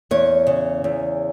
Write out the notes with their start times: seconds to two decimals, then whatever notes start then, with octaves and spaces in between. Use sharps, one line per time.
0.11 E2 C#5
0.47 C#3
0.84 E2